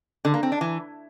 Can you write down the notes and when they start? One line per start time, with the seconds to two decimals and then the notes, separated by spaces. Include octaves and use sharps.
0.25 D3
0.34 A#3
0.43 C4
0.52 D4
0.61 E3